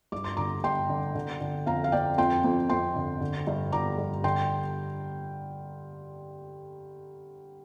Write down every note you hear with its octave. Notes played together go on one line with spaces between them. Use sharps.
G2 D6
C6
D3 A#5 D6
G2 G5 C6
D3
D3
D3
F2 F5 A#5
F5
F2 D5 G5
F2 G5 C6
F2
F2 G5 C6
D3
D3
G2
D3 A#5 D6
G2
D3 G5 C6